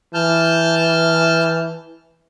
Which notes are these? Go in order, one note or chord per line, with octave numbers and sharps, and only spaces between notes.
E3 A5 F6 G6